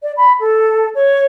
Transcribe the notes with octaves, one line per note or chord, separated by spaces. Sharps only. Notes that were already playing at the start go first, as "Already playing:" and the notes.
D5
B5
A4
C#5